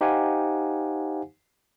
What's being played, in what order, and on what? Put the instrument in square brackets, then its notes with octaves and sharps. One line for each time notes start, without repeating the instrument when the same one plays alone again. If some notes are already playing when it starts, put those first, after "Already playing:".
[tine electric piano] D#4 G4 C5 F5 F#5 G#5